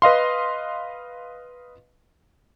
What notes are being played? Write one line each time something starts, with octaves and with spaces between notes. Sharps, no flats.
B4 D#5 F5 C6